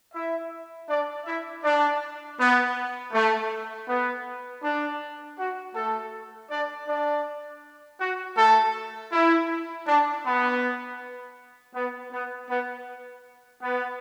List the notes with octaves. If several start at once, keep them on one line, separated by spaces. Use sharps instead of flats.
E4 E5
D4 D5
E4 E5
D4 D5
B3
A3
B3
D4
F#4
A3 A4
D4 D5
D4 D5
F#4
A3 A4
E4
D4
B3
B3
B3
B3
B3